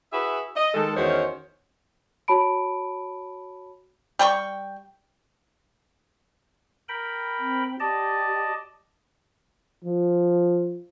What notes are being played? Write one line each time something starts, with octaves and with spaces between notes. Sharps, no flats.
E4 F#4 G#4 B4 E5
D#5
D#3 G#3 A4
E2 D#3 C#4 F#4 C5 C#5
F#4 C#5 A5 B5 D7
G3 G5 B5 C#6
A#4 G5 B5
C4
G4 D5 D#5 A5
F3